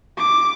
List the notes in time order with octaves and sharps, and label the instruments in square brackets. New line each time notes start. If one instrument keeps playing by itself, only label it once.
[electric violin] D6